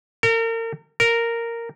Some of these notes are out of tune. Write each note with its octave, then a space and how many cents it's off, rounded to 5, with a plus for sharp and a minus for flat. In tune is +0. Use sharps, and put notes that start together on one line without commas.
A#4 -35
A#4 -5